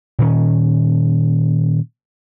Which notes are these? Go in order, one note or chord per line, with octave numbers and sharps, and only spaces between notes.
A#2 D#3 C#4